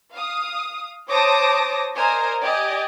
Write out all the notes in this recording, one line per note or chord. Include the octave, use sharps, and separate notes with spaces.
F5 D#6
C5 C#5 A5 D6 D#6 A#6
A#4 C5 D5 D#5 G#5 A#5
G4 D5 D#5 G#5 D6